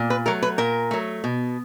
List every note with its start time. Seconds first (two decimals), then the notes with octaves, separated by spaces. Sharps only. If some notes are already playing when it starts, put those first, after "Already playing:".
Already playing: A#2
0.10 B4
0.26 F#3 A3 A#4
0.43 B4
0.58 A#2 A#4
0.91 F#3 A3
1.24 B2